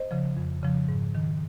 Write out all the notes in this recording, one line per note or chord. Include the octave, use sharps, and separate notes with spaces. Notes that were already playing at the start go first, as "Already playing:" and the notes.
Already playing: C5 D#5
C#3 F3
F2
C#3 F3
G#2
D#3